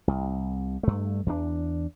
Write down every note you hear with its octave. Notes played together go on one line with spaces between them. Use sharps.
C2
G2 A3
E2 D4